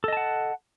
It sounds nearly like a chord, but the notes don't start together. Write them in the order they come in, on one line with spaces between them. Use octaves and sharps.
A4 D#5 A5 F#5